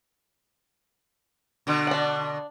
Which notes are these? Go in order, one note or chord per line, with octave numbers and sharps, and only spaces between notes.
B2 D3
D4 F#5